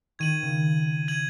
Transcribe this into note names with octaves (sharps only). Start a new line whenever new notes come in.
D#3 G#6 D#7 F#7
C#3
G#6 D#7 F#7